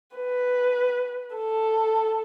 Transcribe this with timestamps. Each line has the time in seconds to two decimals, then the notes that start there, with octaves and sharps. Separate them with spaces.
0.16 B4
1.35 A4